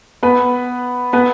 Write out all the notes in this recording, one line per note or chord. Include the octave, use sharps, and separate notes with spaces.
B3 B4
B3 B4